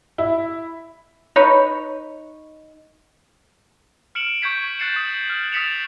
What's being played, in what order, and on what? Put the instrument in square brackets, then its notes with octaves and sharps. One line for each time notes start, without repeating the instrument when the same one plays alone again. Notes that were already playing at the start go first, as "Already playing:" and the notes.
[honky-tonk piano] E4
[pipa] D#4 B4 C#5
[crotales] F6 C#7 D7 E7 F#7
C#6 G6 G#6 B6 C#7
F#6 G6 A6 C7 C#7 E7
D#6
F6
D#6 A6 B6 C#7 E7 F7